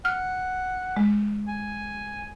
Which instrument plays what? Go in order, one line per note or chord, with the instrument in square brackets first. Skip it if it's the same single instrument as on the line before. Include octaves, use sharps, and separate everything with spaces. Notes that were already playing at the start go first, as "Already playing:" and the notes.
[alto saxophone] F#5 [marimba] F6
[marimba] G#3
[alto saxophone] G#5